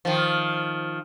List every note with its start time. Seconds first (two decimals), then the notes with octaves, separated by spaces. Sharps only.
0.05 D#3 F3